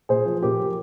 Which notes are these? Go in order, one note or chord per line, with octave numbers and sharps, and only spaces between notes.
A#2 G#4 C5
F3
A#2 G4 A#4
F3